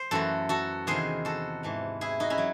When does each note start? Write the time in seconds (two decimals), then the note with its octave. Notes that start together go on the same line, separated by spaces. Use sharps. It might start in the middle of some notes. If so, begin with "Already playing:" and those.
Already playing: C5
0.11 F#2 E3 A3 F#4 A4
0.49 F#4 A4
0.87 E2 C3 D#3 G#4 C5
1.25 F#4 A4
1.63 G#2 E3 A3
2.01 E4 G#4
2.20 D#4 F#4
2.30 C#4 E4
2.38 F#3